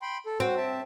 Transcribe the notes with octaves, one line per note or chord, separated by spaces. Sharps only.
G5 B5 C6
A4
C4 F#4
E5 A5